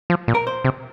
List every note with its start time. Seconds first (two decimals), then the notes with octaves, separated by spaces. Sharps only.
0.10 F3
0.28 A#2
0.35 A#4
0.47 C5
0.64 C3